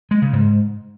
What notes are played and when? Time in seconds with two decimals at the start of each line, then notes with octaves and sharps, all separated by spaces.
0.11 G#3
0.22 C#3
0.33 G#2